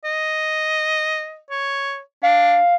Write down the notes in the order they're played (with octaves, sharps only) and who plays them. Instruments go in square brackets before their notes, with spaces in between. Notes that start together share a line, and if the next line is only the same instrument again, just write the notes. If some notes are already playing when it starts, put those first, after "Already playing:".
[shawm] D#5
C#5
[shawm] D4 [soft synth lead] F5